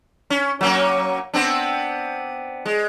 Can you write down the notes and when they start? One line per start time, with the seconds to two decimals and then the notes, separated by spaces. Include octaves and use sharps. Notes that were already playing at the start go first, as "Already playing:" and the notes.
0.30 C#4
0.61 F#3 A#3 C#4
1.34 B3 C4 D4
2.66 G#3